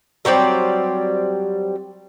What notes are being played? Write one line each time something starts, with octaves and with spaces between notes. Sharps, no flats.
F#3 G3 C4 D5